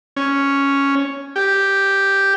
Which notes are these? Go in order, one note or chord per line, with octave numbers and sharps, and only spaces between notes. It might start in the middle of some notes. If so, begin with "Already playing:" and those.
C#4
G4